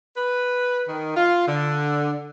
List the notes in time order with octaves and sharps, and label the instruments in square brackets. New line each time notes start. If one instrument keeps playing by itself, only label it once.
[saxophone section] B4
D#3
F4
D3